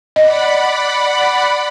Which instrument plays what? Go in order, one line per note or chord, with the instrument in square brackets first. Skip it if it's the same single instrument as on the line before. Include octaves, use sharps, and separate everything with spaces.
[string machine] D5 F#5 B5 [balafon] D#5